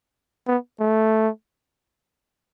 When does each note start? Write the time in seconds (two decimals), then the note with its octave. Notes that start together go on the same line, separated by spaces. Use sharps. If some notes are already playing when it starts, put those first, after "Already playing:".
0.47 B3
0.80 A3